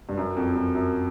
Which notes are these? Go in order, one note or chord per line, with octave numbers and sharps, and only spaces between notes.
G2
F#2
F2
F#2
F#2